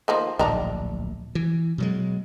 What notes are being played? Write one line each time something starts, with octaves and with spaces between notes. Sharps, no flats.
D#3 F3 A#3
D1 A#1 D#3 D4 A#5
E3
B2 F#3 G#3